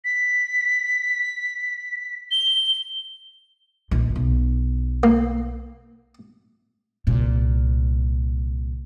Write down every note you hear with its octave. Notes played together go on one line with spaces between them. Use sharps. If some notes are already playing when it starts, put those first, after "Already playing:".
B6
G7
A#1 D#3
B1
A#3
C2 A#2